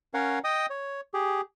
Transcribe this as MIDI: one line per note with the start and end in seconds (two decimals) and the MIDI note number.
0.14 0.39 61
0.14 0.39 70
0.14 0.39 73
0.14 0.39 77
0.14 0.39 78
0.44 0.66 75
0.44 0.66 79
0.44 0.66 87
0.70 1.01 73
1.14 1.41 67
1.14 1.41 68